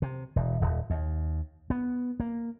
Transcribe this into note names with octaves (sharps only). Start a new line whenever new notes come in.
C3
E1
D#1
D#2
B3
A#3